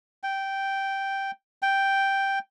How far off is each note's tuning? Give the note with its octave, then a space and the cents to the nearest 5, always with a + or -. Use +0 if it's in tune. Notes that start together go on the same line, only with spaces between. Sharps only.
G5 -5
G5 +0